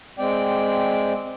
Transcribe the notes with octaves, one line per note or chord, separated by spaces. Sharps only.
G#3 C4 D5 G5